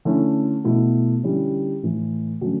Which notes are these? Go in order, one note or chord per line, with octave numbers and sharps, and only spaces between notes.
D3 A3 C#4 E4
B2 A3 E4
D3 G3 C#4 E4
A2 E3 A3
D3 F#3 A3 C#4